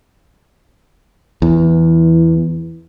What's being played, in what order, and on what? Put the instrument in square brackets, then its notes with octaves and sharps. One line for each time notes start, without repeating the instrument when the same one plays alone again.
[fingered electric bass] E2 [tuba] E3